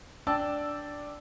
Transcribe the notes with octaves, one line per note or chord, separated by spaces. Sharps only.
D4 D5 G5 A5 E6